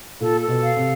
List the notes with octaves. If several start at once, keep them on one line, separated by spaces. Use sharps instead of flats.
A#2 A4
A4
B2
F5
C3